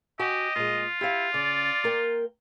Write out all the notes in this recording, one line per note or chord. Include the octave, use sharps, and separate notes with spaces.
F#4 G4 D#5 F#5 G#5
A#2 G#3 F4
E4 G4 F5
C#3 D5
A#3 A#4 G5